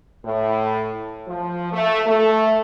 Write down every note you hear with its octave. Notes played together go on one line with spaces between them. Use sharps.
A2
F3
A3
A3